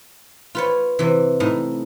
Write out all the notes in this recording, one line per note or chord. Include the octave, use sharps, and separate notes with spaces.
F4 B4 C#5
C3 E3
A2 D#4